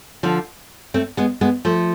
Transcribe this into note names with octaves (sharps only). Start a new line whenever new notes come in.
D3 F3
A3 C4
G#3 B3
G#3 B3
F3 A3